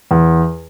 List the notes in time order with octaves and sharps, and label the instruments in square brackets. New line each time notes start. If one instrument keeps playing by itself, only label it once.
[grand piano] E2